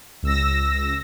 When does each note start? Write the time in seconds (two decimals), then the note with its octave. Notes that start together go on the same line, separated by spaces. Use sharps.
0.23 C#2 E6 A#6